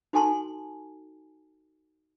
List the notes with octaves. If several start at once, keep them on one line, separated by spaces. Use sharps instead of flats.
D#4 F#4 A4 G#5 A5 C6